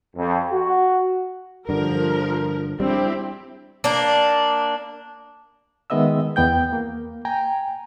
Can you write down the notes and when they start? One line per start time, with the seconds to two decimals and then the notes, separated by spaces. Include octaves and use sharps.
0.16 F2
0.52 F#4
1.69 G2 D3 F3 A#4
2.80 G3 B3 C4 D4 E4 G4
3.84 A#3 D4
5.90 D#3 G#3 B3 D#5 E5 E6
6.36 E2 B3 G5 G6
6.73 A#3
7.25 G5 G#5 A#5